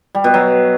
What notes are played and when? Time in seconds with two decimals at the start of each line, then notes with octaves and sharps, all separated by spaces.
0.15 G3
0.24 B2
0.34 F#3